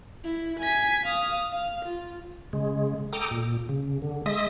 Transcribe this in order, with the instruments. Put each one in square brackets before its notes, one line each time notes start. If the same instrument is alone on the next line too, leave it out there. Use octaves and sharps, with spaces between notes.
[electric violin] E4
G#5 B6
F5 D#6
F5
F4
[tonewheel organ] C#3 G#3
A4 G5 A#5 D6 D#6
A#2
C#3
D3
G#3 E5 D#6 A#6